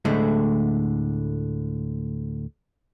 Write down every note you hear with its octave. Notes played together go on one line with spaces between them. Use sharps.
D2 A2 D3 G#3 A3 E4